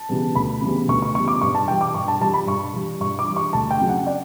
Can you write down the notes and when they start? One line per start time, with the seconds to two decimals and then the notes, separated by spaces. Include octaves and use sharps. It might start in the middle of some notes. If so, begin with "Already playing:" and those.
Already playing: A5
0.09 C#3 E3 G3 B3
0.35 D2 B5
0.61 C#3 E3 G3 B3
0.88 D2 C#6
1.02 C#6
1.14 C#3 E3 G3 B3 C#6
1.28 D6
1.41 G2 C#6
1.55 A5
1.68 E3 G3 G5
1.81 D6
1.94 G2 C#6
2.08 A5
2.21 E3 G3 A5
2.34 B5
2.47 G2 C#6
2.73 E3 G3
3.00 G2 C#6
3.19 D6
3.28 E3 G3
3.36 C#6
3.53 D2 A5
3.71 G5
3.81 C#3 F#3
3.89 F#5
4.06 D5